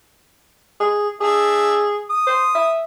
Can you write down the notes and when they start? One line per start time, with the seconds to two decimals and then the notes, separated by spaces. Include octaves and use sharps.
0.80 G#4
1.21 D4 G#4 E5
2.10 D#6
2.27 C5
2.55 E5